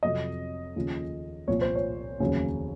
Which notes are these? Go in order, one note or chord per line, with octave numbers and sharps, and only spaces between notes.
F2 C3 F#3 D#5
D#2 C#3 F3
C2 A#2 F3 C#5
C5
C#5
F1 D#2 C#3 F#3